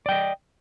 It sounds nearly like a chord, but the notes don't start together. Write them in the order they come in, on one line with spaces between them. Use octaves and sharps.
D5 G5 D#5